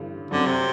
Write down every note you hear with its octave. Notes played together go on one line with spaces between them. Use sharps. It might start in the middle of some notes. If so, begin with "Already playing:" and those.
Already playing: A1 G2 D3
F#2 D3 F#3 C4 F#4
C3